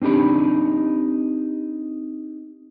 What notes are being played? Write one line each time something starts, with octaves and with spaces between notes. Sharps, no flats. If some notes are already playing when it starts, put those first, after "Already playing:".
C4 D4 D#4 G4 B5